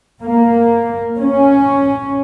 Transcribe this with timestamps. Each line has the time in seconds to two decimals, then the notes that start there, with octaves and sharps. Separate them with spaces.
0.23 A#3
1.18 C#4